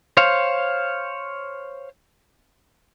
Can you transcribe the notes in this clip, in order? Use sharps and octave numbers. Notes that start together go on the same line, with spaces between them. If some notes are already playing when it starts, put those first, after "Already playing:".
C5 C#5 F5